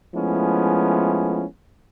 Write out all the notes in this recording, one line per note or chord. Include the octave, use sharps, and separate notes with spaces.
F3 G#3 A3 B3 C#4 E4